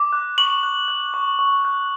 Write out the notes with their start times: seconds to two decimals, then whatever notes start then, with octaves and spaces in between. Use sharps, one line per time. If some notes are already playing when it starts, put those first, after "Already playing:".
Already playing: D6
0.13 F#6
0.38 C#6 F#7
0.63 F#6
0.88 F#6
1.14 C#6
1.39 C#6
1.65 F#6